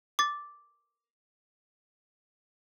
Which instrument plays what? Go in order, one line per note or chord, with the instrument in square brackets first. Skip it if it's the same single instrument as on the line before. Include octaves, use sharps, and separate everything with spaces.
[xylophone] D6 A6